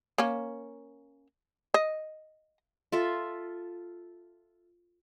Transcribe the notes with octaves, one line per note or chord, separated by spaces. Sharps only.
A#3 C#4
D#5
F4 A4 E5